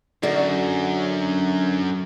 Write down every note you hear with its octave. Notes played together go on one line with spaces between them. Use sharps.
F#2 D3 F#4 D5